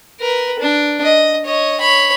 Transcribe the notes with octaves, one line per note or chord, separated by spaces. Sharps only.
A#4 B4
D4
D#5
C#5 D#5
C#5 B5